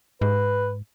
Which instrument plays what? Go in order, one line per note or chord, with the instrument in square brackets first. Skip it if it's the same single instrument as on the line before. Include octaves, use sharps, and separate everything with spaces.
[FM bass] G#2 [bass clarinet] B4